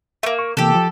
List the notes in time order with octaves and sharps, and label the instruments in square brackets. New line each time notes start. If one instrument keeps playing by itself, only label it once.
[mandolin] A3 A#3 [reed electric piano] E5
[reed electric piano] C#6
[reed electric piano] C3 E3 A#3 [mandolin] G4 A4
[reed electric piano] F3